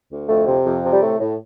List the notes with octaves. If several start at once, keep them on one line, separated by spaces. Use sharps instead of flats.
D2
F2 A3
C3
F2
C3
G3
A2 A3
A2